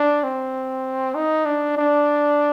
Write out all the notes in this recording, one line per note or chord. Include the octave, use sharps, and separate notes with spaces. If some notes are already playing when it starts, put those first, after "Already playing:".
Already playing: D4
C4
D#4
D4
D4